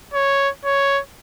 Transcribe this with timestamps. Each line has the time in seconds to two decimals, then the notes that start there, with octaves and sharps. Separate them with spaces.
0.14 C#5
0.65 C#5